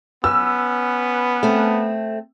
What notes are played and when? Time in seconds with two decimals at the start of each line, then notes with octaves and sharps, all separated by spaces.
0.24 B3 C#4 B4 E6
1.43 A3 C4